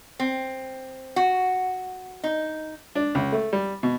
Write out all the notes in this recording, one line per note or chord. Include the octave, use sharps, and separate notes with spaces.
C4
F#4
D#4
D4
C#2
A3
G3
B2